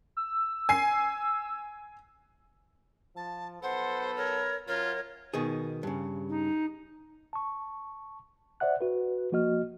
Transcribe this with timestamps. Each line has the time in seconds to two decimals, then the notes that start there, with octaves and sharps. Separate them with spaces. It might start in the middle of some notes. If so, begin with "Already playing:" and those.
0.17 E6
0.69 G#5 C7
3.16 F3 A5
3.63 B1 B3 A4 B4 C5 F#5
4.17 A#4 C#5
4.68 F#2 F4 A#4 C#5
5.34 B2 D#3 G#4
5.83 G2 C#3
6.29 D#4
7.33 A5 C#6
8.60 C5 D5 E5 F#5 F#6
8.81 F#4 B4
9.32 F3 A#3 F#4 D#5 F6